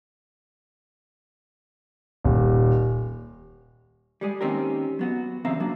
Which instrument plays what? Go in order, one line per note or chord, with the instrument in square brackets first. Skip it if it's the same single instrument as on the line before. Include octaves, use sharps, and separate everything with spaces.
[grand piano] D#1
[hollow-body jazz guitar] G3 G#3 G#4
D#3 A#3 C4 C#4 G4 A#4
F#3 B3 F#4
E2 C#3 C4 E5 F5 A#5
F#3 A#3 D4